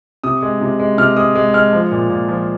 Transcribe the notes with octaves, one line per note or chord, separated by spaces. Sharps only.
C3 D#6
G#3
C3
G#3
C3 F6
G#3 D#6
G#3
G#3 F6
F3
A#2
A#2
F3